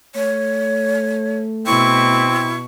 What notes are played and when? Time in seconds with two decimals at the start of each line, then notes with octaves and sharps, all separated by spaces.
0.15 A3 C#5
1.66 B2 C4 E4 C#6